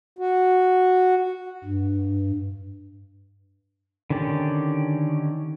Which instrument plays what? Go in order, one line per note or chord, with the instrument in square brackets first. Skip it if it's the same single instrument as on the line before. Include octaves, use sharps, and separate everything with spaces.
[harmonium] F#4
[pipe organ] G2
[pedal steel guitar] D3 D#3 C#4 G4 D5